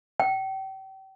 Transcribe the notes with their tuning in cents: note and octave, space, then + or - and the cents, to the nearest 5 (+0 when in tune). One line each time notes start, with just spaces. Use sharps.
G5 -35